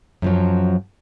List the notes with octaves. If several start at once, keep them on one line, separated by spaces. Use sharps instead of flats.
F#2 F3 F#3